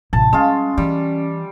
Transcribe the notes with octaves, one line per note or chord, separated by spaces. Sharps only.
A1 C3 A5
G3 G#3 C#4 F4
E3 G3